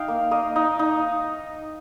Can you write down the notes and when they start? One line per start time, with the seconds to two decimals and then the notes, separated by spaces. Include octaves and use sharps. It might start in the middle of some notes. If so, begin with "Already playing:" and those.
Already playing: D#4 F5 G5
0.08 A#3
0.31 A#3 D#5
0.56 D#4
0.79 D#4